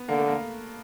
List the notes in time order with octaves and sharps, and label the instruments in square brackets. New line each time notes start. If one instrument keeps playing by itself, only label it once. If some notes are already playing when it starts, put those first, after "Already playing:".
Already playing: [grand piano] B3
[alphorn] D3 [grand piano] A#3
[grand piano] A3
A#3